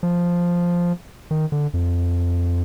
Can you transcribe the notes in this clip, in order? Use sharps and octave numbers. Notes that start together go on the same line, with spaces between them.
F3
D#3
D3
F2